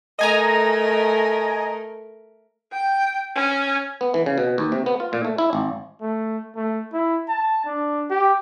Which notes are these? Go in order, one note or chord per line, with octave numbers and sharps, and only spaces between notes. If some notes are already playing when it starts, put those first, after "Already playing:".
A3 A#4 D#5 G#5 A#5
G5
C#4
B3
E3
C#3
B2
D#2
C3
B3
F4
A#2
A3
E4
G#1
A3
A3
E4
A5
D4
G4